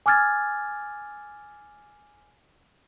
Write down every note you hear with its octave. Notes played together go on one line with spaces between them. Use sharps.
G#5 D6 E6 F6 G#6 A6